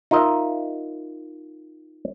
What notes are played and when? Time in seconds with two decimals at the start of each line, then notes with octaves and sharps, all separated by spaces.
0.11 D#4 F4 A#4 D#5 E5